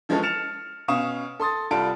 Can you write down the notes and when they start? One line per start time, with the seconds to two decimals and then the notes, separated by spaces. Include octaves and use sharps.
0.09 E3 F3 G#3 A3 C#4 A4
0.22 F6 A6 C#7 E7 F7
0.88 B2 C#4 F5 C#6 D#6 E7
1.40 A4 C6 D#6 A6
1.71 C2 G3 F4 A4 A5 D7